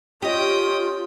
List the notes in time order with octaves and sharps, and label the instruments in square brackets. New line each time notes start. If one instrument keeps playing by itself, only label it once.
[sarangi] C#4 [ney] F4 [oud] G4 D#5 [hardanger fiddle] G5 D#6